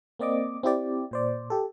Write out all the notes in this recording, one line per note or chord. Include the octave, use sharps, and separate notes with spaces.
A#3 C4 D5 D#5 D6
C4 E4 G4 D5
A#2 C5 D5
G4 A4